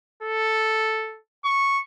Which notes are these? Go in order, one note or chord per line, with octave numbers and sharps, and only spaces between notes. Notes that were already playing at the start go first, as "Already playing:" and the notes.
A4
C#6